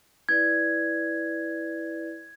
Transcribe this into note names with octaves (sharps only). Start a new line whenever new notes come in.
E4 B4 D5 G#6